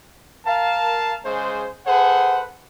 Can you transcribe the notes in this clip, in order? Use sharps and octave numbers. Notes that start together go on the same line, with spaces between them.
A#4 F5 A5
C#3 G#3 G#4 C5
G#4 A4 B4 C5 F#5